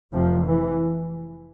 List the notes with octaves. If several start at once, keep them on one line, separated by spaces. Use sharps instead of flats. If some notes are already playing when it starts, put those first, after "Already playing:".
F1 F2 C3 F3
E3